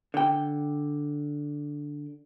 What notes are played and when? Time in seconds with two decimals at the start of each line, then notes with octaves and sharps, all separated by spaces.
0.14 D3 G5